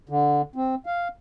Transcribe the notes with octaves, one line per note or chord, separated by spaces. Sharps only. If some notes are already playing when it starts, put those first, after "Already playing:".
D3
C4
F5